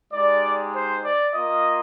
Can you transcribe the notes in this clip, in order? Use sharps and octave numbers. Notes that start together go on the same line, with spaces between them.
G#3 D#4 G4 D5
C5
D5
A#3 F4 D#5